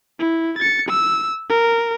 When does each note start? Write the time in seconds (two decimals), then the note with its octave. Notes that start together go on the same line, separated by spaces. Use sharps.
0.19 E4
0.58 A6 C#7
0.89 E6
1.49 A#4